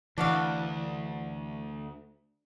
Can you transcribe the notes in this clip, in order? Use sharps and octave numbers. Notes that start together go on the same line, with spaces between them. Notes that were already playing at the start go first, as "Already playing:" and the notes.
D2 E3 D4 F#4 F5